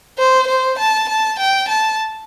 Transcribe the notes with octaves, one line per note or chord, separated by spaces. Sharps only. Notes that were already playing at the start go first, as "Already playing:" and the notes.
C5
C5
A5
A5
G5
A5